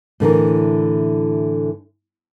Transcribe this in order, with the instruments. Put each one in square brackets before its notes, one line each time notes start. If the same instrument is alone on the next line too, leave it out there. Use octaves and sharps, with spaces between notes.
[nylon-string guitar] A2 D3 E3 A#4